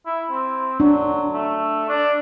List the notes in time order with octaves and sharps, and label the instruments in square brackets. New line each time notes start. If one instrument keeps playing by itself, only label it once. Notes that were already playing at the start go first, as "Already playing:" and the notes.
[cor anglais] E4
C4
[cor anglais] F#3 [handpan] D4
[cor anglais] A3
D4